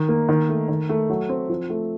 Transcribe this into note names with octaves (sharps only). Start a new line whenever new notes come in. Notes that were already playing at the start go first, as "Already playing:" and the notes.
Already playing: D#3
A#3
D#3
A3
D#3
A3
F#3
C4
F3
A3